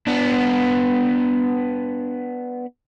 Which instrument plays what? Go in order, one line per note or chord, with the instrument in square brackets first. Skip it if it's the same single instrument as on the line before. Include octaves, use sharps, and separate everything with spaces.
[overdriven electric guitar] B3 D4